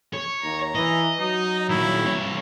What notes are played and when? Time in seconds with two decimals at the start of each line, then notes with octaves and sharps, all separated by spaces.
0.13 C#5
0.43 D#2 A#5
0.75 E3 D#5
1.20 F#3 D#4
1.69 A#2 D#3 E4
2.05 C2 C#5